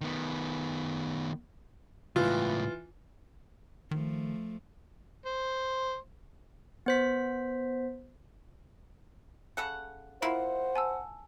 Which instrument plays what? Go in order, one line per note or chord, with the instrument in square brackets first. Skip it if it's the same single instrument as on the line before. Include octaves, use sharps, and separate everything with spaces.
[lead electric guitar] D#3 B3
[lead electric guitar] C#2 A2 [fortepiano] E3 F4
[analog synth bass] D#3 [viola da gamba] F3 A3
[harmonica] C5
[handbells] B3 C5 B6
[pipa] C#3 A4 F#5 [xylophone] F#6
[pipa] A#3 E4 F4 [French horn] C5 [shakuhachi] F#5 [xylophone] B5
[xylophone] G#5 A5 E6